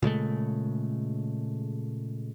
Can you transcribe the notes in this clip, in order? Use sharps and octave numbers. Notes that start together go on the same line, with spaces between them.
A#2 C#3 G#3 A3